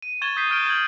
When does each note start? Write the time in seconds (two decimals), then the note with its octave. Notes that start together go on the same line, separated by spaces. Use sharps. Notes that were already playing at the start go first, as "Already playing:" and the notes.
0.02 D#7
0.22 C#6 G#6 A6 E7 G7
0.36 D#6 G6 B6 C7 D#7
0.50 C#6 F6 G6 D7 G7
0.66 G#6 E7 F#7